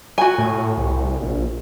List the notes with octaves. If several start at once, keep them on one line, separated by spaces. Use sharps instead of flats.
F#4 G#5
A2
C2
A#1